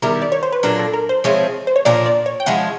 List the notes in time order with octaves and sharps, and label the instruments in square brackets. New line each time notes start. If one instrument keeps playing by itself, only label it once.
[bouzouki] D#3 G3 B3 E4 [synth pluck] A#4
[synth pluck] D5
C#5
C5
B4
[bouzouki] A#2 F#3 A#3 D4 [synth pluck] A#4
[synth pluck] A4
A#4
C5
[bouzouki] F3 G#3 C4 E4 [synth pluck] C#5
[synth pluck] C5
C#5
[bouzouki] A#2 F3 A#3 D4 [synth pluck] D5
[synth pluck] D5
C#5
G5
[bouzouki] F3 G#3 C#4 E4 [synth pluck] F#5